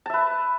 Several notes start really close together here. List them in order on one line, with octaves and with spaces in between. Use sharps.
A5 E5 B4